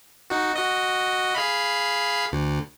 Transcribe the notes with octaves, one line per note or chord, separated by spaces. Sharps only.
D#4 F#4
F#4 D#5
G#4 F5 B5
D2